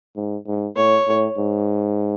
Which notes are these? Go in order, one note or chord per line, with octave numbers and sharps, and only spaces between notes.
G#2
G#2
A2 C#5
A2
G#2